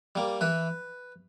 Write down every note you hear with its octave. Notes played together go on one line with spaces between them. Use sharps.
G3 A#3
E3 B4